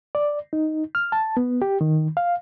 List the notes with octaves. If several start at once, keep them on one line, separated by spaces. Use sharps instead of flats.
D5
D#4
F6
A5
B3
G4
D#3
F5